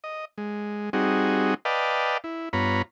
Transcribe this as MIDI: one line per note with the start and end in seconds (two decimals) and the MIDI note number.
0.04 0.25 75
0.38 0.90 56
0.93 1.54 55
0.93 1.54 60
0.93 1.54 63
0.93 1.54 66
0.93 1.54 68
1.65 2.18 71
1.65 2.18 74
1.65 2.18 75
1.65 2.18 77
1.65 2.18 79
1.65 2.18 81
2.24 2.49 64
2.53 2.82 43
2.53 2.82 59
2.53 2.82 65
2.53 2.82 73
2.53 2.82 82
2.53 2.82 83